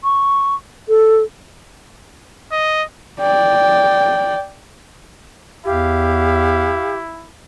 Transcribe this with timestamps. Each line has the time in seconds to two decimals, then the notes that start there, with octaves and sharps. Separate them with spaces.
0.04 C#6
0.88 A4
2.52 D#5
3.20 D5 G5
5.65 E2 E4 G4 F5